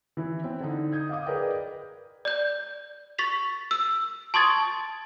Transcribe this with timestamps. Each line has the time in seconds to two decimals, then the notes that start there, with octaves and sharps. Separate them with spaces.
0.17 E3 E4
0.44 C4
0.60 D3 D#4
0.93 D#6 G6 G#6
1.09 D#5 F5 D6 D#6
1.26 G#4 A#4 B4 D5 D#5 G5
2.25 D5 G6
3.18 C#6 A6 B6 F7
3.71 E6
4.34 A5 C6 C#6 D#6 G#6 A6